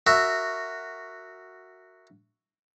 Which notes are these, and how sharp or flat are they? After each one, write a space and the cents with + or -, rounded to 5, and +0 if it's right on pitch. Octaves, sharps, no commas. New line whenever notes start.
F#4 +0 A#4 -20 E5 +0